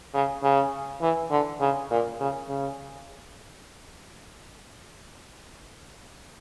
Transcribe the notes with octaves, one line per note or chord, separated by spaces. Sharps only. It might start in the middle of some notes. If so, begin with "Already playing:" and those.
C#3
C#3
E3
D3
C#3
A#2
C#3
C#3